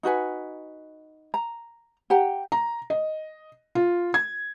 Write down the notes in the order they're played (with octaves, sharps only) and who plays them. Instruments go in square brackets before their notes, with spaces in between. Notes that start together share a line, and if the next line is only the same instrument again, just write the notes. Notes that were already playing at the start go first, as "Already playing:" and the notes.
[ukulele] D#4 F#4 B4 G#5
A#5
G4 F#5 G5 A#5
[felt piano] A#5
D#5
F4
G#6